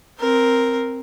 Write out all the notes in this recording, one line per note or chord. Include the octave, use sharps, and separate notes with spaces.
C4 A#4